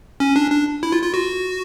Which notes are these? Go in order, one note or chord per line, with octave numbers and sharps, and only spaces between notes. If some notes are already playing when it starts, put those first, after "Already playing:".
C#4
D4
D4
E4
F4
F4
F#4